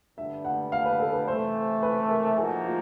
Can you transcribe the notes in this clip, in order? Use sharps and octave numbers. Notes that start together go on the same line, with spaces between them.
G2 D3 G3 B3 D4 E5
F#5
F5
B4
A4
B4
C3 E3 A3 C5
B4
A#4
F3 A#3 D#4 F#4 G#4
F4